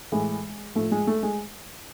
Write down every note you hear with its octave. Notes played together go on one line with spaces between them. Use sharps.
A2 E3 G#3
A2 F3 A3
G#3
A3
G#3